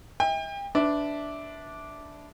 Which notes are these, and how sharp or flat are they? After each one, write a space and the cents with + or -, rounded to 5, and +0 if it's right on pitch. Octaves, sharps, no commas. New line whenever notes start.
E5 -40 G5 +35
D4 -10 B4 +20 E5 -15